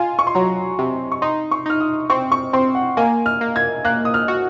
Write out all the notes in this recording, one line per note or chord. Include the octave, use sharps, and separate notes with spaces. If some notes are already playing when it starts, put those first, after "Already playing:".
Already playing: F4 G#5
C#6
C6
F#3 A#5
C3
C#6
D#4 C6
C#6
D#4 F6
D#6
C4 C#6
C#6
C4 C6
F#5
A#3 G#5
F6
A#3
G#6
A#3 F#6
D#6
F6
F#4